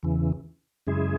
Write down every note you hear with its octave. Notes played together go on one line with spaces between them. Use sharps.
E2 C#3 E3
F#2 C#3 G#3 E4 G#4